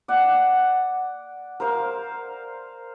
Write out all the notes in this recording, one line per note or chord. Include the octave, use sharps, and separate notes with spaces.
D5 F#5
A#4 C5 F5